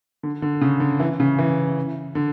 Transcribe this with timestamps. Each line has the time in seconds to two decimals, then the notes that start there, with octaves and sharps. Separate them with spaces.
0.23 D3
0.42 D3
0.61 C#3
0.80 D3
1.00 E3
1.20 C#3
1.38 E3
2.15 D3